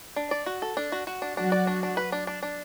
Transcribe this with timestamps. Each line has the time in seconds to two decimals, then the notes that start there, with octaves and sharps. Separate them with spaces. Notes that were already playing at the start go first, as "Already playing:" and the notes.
0.16 D4
0.31 D5
0.46 F#4
0.62 A4
0.77 D4
0.92 F#4
1.07 F#4
1.22 D4
1.37 F#3 D4 F#4
1.52 D5
1.67 D4
1.83 D4
1.97 B4
2.12 D4
2.27 D4
2.43 D4